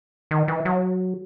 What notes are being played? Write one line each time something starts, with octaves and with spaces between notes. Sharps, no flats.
D#3
E3
F#3